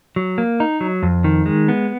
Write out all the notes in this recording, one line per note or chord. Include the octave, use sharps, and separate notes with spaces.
F#3
A#3
D#4
F#3
F2
D#3
G#3
B3